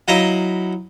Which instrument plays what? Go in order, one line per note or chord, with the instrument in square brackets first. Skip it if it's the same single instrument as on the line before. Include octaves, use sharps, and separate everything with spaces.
[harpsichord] F#3 D#4 E4 D#5 F5 A#5